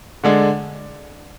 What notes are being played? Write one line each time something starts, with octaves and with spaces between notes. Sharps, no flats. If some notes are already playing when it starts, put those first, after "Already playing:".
D3 G#3 D4